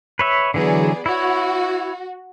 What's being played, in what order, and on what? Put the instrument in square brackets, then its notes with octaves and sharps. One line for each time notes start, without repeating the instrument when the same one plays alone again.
[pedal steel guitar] B4 C#5 E5
[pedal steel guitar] D3 E3 F#3 [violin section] B3 G#4 D5
[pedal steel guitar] E4 C#5 [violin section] F#4